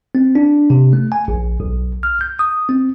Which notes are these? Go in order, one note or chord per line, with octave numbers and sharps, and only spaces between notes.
C4
D4
C3
A3
G#5
A#1
B1
F6
G6
D#6
C4